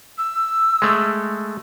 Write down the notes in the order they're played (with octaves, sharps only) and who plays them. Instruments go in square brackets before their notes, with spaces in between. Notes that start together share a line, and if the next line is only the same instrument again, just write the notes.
[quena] E6
[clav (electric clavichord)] G#3 A3